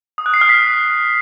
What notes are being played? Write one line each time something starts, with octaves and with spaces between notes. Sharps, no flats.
D#6
F#6
C7
F6
B6